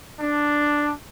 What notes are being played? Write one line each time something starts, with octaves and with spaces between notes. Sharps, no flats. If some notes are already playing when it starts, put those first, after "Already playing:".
D4